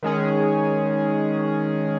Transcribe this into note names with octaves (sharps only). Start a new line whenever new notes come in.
D#3 G#3 C#4 G#4